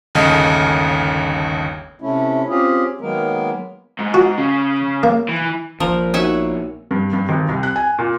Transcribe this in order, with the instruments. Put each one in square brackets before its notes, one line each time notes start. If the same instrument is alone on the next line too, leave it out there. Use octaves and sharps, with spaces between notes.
[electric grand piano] G1 D#2 C#3 A3 D#5
[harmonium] C3 A3 C#4 E4
C4 C#4 F4 G4 G#4
D#3 F#3 G#3 A#3 B3 A#4
[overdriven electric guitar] G#2
[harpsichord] F#4
[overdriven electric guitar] C#3
[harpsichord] A#3
[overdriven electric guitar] E3
[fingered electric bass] A#1 A#2 [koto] F3 A#4
[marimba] B3 D#4 F#4 [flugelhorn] C#5 [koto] E5 F#5 G#5
[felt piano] G2
G2
G#1
C2
F#6
G#5
A#2